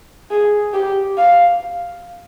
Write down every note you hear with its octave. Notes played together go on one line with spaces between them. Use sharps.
G#4
G4
F5